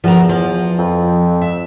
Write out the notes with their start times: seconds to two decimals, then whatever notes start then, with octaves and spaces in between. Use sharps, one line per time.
0.04 E2 F3 F#4 A#4
0.29 F3
0.79 F2
1.41 E5